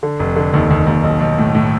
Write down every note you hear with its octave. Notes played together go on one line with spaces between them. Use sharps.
D3
F1
D3
D#2
D#2
D#2
B1
B1
A2
A2